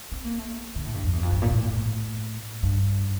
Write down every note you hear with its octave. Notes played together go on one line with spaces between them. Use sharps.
C4
A#3
A3
D3
A2
G2
F2
E2
F2
G2
A#2
A2
A2
G2